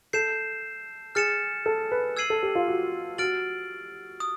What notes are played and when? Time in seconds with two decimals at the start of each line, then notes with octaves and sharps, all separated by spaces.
0.13 A4 G6 C7 E7
1.15 G#4 F6 A6 C#7 E7
1.66 A4
1.91 B4
2.17 E6 G#6 C7 D#7 F#7
2.30 A4
2.43 G4
2.55 F4
2.68 F#4
3.18 F#4 F6 A6 D7 F#7
4.20 D#6